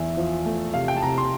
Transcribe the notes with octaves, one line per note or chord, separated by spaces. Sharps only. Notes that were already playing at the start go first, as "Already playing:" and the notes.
Already playing: E2 E5
F3
A3
C3 F5
G5
A5
C3 A#5
C6